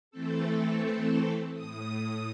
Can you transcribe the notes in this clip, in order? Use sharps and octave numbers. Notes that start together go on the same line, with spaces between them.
E3 A3 C4 A4
A2 D#6